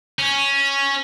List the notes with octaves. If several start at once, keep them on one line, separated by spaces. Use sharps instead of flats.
C#4